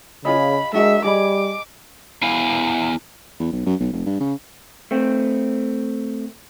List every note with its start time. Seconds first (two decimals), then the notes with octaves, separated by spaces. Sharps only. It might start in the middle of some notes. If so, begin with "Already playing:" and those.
0.25 C#3 F4 G#4 D#5 B5
0.74 G#3 D4 F#4 A#4 E5
1.04 G3 G#4 D#5 B5 D6
2.22 B3 E4 F5 G#5
3.40 E2
3.52 B1
3.66 F#2
3.80 B1
3.93 F1
4.06 G2
4.20 C#3
4.91 A3 C4